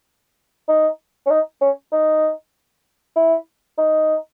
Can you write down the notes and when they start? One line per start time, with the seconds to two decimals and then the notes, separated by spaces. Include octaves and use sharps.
0.68 D#4
1.26 C#4
1.30 D#4
1.61 C#4
1.92 D#4
3.16 E4
3.78 D#4